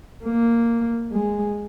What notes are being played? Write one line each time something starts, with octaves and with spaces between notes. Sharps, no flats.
A#3
G#3